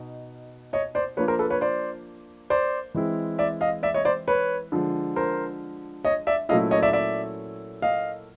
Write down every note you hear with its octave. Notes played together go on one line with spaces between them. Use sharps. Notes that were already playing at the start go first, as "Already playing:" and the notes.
Already playing: B2 D#4
C#5 D#5
C5 D5
F3 A#3 D4 F4 B4 C#5
A#4 C5
A4 B4
B4 C#5
C5 D5
C5 D5
E3 G#3 C4 E4
D5 E5
D#5 F5
D5 E5
C#5 D#5
C5 D5
B4 C#5
D3 F3 G#3
A#4 C5
C#5 D#5
D5 E5
A#2 F#3 A3 C#4 E4 D#5 F5
C#5 D#5
D5 E5
D5 E5
D#5 F5